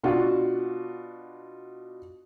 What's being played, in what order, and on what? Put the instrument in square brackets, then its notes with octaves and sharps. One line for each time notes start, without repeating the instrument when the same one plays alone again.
[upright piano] B2 D4 F4 F#4